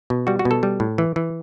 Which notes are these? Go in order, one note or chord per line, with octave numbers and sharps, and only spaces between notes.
B2
G3 F#4
F#4
B2
A4
G3
A2
E3
E3